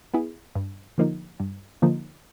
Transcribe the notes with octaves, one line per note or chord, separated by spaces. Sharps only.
B3 E4 G#4
G2
D3 F3 A#3 D#4
G2
D3 F3 A#3 D#4